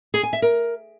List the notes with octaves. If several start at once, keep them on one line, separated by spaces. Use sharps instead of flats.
G#4
G#5
E5
A#4